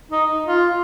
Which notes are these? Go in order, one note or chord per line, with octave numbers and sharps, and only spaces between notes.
D#4
F4